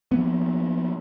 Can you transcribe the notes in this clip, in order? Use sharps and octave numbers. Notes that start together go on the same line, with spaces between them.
F3 A#3 B3